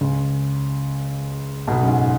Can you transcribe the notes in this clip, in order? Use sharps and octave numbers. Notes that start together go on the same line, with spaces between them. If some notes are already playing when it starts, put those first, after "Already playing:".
C#2 C#3
B1 B2
F#2
G#2